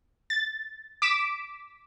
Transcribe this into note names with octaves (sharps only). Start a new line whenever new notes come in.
A6
D6 B6 D7 E7